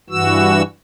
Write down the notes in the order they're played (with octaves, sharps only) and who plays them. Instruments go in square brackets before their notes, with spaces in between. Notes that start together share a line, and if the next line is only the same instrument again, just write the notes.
[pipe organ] G2 E3 F#4 E6